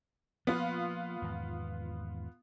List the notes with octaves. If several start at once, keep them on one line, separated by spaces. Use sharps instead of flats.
F3 A#3 B3 F4
E2 G#2 D#3